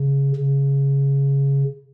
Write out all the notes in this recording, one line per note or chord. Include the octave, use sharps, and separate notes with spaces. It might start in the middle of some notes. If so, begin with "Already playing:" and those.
Already playing: C#3
C#3